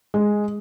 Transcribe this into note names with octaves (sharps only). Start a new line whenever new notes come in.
G#3